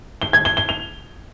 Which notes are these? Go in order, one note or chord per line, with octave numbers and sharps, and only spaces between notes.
G7
G#6
G7
G7
F7